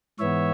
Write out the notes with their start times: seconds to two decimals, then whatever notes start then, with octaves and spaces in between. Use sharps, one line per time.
0.19 G#2 E3 B3 C#5 E5